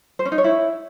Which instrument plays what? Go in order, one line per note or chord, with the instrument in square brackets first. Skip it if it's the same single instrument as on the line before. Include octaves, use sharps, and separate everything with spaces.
[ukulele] C5
C#4
D#4
C#5
E4